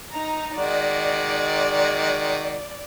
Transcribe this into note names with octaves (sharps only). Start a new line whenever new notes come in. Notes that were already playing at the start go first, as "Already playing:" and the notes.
D#4 A#5
D#3 G#3 F#4 D5